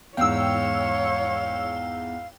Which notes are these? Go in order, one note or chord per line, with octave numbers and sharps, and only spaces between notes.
E2 G#2 C#5 F5 G5 E6